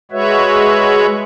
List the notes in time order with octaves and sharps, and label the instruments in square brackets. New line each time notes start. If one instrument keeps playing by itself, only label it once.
[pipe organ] G#3 F#4 B4 C#5 E5